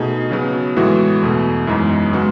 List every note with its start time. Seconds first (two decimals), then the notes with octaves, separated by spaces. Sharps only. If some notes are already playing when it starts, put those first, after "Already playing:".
Already playing: B2 A3 D#4 G#4
0.31 C#3 F#3 B3
0.77 A2 E3 G#3 B3 F#4
1.22 E2 B2 A3
1.67 F#2 E3 G#3 B3 D#4
2.13 C#3 G#3 B3 F#4